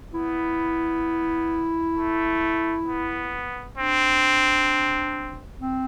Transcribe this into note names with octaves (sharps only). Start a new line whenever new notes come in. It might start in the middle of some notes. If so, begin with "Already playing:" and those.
B3 E4
A3
B3
C4 D4
C4